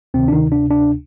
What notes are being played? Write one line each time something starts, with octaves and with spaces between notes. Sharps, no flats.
D2 C3 D#3 C4
D4
D#3 D#4
D4
D4